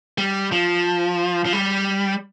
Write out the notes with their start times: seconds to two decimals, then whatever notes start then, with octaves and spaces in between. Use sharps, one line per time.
0.18 G3
0.52 F3
1.45 F3
1.53 G3